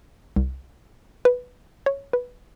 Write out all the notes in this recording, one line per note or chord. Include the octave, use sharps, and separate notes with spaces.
C2
B4
C#5
B4